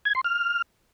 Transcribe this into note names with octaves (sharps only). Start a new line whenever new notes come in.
G#6
C6
F6